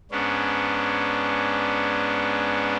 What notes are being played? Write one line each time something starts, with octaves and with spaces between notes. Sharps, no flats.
G#2 B3 C#4 D4